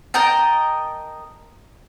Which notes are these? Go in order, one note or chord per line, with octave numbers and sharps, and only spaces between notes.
A#4 D#5 G5 A5